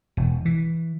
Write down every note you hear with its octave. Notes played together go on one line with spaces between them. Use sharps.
E1
E3